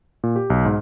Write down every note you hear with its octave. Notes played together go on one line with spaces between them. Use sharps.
A#2
G4
B1
G#2